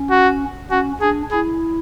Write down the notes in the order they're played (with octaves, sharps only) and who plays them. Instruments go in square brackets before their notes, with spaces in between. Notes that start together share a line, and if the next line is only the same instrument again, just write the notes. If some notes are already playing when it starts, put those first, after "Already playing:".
Already playing: [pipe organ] C#4
[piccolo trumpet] F#4
[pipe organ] C#4 [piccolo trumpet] F#4
[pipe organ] D4 [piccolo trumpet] G#4
[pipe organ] E4 [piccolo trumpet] G#4